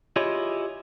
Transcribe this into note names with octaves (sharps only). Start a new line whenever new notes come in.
E4 F4 G4 G#4 C#5 D#5